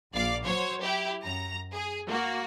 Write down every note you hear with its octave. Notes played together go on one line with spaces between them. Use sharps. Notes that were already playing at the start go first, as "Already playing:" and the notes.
A#1 D5 F5 D6
F#3 C5 C#5
E4 G4
F#2 A#5
G#4
A#3 F#4